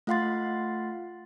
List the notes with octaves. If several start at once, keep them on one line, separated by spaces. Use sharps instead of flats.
A3 F4 F5 F#5 C6 A6